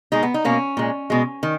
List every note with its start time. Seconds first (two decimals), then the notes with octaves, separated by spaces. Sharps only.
0.12 B2 G#3 D#4
0.23 B3
0.34 D#4
0.45 B2 A#3 C#4
0.77 A#2 G#3
1.10 B2 G#3
1.43 D#3